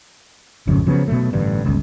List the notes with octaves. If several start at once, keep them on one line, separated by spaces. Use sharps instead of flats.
D1 G#1 F2 C#3
C#3 F3 F#3 B3
B2 F#3 A3
A1 G2 D3
G1 C#2